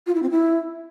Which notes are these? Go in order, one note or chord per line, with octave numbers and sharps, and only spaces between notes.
F4
E4
C4
E4